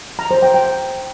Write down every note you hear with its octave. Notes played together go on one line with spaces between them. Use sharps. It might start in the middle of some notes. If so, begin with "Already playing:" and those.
A#5
C5
G5
G5